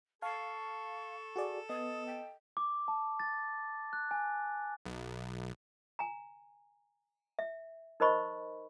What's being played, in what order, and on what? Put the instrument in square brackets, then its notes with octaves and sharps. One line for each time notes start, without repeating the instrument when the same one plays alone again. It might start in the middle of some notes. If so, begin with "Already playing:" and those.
[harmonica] A4 [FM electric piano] F5 [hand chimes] A5 C7 [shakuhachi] C#6
[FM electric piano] F#4 G#4 D5
[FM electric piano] B3 [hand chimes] D#5 [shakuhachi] D#6
[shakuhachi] G5
[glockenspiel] D6
A5
A6
F#6
G#5
[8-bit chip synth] B1
[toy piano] G#5 A#5
E5
D#4 A#4 C5 D#5 B5 C#6